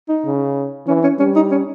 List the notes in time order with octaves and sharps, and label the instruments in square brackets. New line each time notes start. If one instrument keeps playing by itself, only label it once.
[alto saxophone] D#4
[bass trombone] C#3
[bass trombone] E3 [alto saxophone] C#4
[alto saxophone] C#4
[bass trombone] G3 [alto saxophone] C#4
[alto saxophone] D#4
C#4